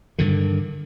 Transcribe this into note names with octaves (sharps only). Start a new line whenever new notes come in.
G2 D3 D#3